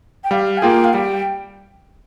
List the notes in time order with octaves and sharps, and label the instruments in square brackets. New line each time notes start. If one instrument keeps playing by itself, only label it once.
[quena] G5
[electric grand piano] G3 [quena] F5
[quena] G#5
[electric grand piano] A#3 F4 G#4 [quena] G5
[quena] F5
[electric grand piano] G3 [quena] G5